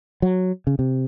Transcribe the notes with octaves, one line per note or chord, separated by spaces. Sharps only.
F#3
C#3
C3